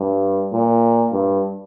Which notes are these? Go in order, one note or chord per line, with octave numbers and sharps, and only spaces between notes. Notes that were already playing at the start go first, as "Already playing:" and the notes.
Already playing: G2
A#2
G2